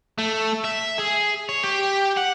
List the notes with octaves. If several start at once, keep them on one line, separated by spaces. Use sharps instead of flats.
A3
E5
G#4
C#5
G4
F#5